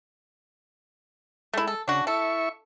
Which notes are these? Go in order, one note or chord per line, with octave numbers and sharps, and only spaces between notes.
G#3 A3 E4
A4
C#3 D4 F#4
E4 A4 E5 C#6